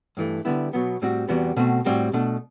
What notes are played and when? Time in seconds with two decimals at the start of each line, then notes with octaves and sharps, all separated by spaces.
0.17 G2 E3 A3
0.45 D3 G3 B3 E4
0.73 B2 F#3 B3
1.02 A2 G3 C4 F#4
1.29 E2 C3 G3 B3 F#4
1.57 B2 A3 C4 F#4
1.85 A2 G3 C4 F#4
2.13 B2 A3 D4